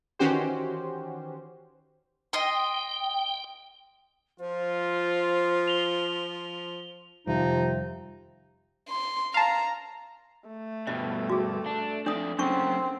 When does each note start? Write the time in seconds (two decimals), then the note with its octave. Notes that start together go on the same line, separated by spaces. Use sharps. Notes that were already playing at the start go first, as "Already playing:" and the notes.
0.19 D#3 E3 C#4 F#4 G4 C5
2.33 D#5 G5 C6
4.40 F3 F4 C5
5.68 F7 G7
7.27 F2 C3 D#3 F3 G3 D#4
8.89 C6
9.34 F5 A5 A#5
10.49 A3
10.87 G2 B2 D#5
11.30 F#4 G#4
11.66 D4
12.06 F2 D4 D5 D#6
12.39 F#2 C#3 C4 D4 C#6